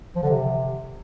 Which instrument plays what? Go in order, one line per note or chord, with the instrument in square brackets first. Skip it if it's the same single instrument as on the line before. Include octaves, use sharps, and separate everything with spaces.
[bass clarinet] F3
D3
C3